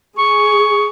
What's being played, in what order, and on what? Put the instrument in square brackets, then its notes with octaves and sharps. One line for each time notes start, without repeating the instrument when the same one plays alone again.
[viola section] G#4 [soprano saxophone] C#6